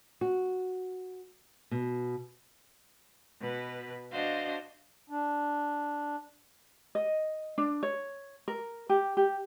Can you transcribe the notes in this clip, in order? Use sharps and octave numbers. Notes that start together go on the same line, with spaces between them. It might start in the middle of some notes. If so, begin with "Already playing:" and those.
F#4
B2
B2 B4
D4 F#4 C5 D#5 F5
D4
D#5
D4
C#5
A#4
G4
G4